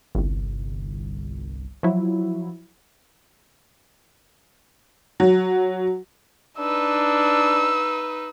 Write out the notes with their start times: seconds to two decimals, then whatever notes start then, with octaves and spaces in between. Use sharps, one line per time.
0.15 G1 C2
1.83 F3 F#3 E4
5.20 F#3
6.59 D4 D#4 B4 E6